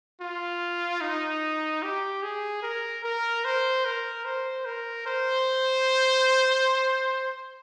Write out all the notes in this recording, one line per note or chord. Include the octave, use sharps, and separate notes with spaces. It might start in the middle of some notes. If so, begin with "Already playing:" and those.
F4
D#4
G4
G#4
A#4
A#4
C5
A#4
C5
A#4
C5